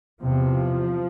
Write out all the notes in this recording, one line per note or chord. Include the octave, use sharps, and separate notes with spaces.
E2 C3 F3